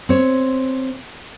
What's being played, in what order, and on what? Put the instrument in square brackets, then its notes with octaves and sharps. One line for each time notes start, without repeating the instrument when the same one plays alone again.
[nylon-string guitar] C4 C#5